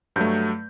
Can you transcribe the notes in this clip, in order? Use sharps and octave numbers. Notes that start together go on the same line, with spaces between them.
G2 F#3 A3 G6